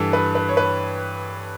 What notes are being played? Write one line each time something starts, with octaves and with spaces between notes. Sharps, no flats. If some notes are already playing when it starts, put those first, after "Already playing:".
Already playing: G2 E3 A4
B4
B4
C#5
B4